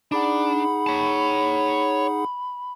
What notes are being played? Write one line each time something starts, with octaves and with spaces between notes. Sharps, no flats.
D4 D#4 G#4 F#5 B5
C#5 A5